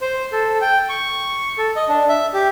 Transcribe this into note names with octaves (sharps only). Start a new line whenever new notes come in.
C5
A4
G5
C#6
A4
D#5
D4
E5
G4